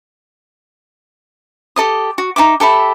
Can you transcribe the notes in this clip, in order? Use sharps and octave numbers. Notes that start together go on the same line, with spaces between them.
G4 A4 D#5 D#6
F#4
D#4 F#4 E5 D6
G4 A4 E5 B5